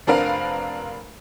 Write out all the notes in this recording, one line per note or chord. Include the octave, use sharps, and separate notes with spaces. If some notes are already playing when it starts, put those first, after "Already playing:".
F1 C4 D4 A#4 B4 F5